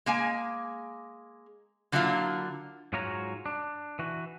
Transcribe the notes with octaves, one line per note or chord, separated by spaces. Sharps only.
G#3 A#3 G#5
D3 F#3 A#3 E4 F4
G#2 F#3 F4 F#4 C#5 A#5
D4
E3 F#4